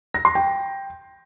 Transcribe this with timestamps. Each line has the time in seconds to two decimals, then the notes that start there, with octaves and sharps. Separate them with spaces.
0.14 A#6
0.25 C6
0.35 G5